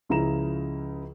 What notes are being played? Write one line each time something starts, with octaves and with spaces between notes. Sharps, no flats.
C#2 C#3 F3 E4 A#5 E7